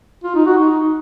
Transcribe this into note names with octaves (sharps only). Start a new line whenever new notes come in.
F4
D#4
F#4
D#4